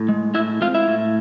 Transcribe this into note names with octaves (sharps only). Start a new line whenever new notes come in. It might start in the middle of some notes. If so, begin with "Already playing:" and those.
Already playing: A2
G#3
A2 E4 E5
C4 F4 F5
E4 E5
A2